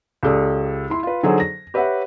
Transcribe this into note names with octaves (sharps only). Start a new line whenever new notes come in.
C#2 G4 A4 D5 D#6
E4 C6
F4 B4
D3 F#3 D#4 G#4 A4 C5
A#6
G4 B4 C#5 E5 F#5